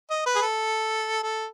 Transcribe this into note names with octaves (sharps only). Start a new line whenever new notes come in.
D#5
B4
G#4
A4
A4